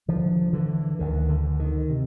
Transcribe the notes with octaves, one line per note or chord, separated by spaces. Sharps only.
D#2 D3 D#3 F3
D3 E3
D2 D3 D#3
D3
D#3
C3